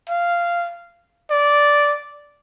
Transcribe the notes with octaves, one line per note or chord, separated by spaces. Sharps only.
F5
D5